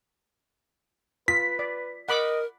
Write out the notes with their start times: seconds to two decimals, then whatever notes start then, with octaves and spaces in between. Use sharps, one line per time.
1.28 F4 B4 B6
1.59 D5
2.09 A#4 D#5 F#5 B5 D6